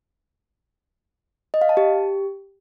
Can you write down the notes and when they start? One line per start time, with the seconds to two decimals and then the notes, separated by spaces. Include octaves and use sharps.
1.54 D#5
1.62 F5
1.69 A5
1.77 G4